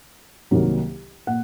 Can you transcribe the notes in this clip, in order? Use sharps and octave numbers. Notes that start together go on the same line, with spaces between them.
C2 C3 D#3 F#3 A#3
A#2 F#5